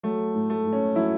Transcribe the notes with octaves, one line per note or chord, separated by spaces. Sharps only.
F#3 A3
A2
A3
A2
C#4
F#3 E4